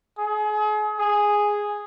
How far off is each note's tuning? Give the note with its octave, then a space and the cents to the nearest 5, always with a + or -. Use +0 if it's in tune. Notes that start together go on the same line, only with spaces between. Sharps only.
G#4 +35
G#4 -5